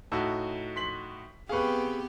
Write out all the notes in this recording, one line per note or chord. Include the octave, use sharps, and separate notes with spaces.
A2 D#4 F#4 A5 E6
C6 B6 F#7
B3 C4 G4 G#4 B4 F5 C#6